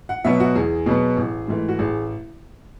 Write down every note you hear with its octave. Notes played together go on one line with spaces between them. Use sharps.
F#5
B2 F#3 B3 E5
F#4
E2 G#4
B2 F#3 B3
A1
G#2 E3 A3
F#4
A1 G#4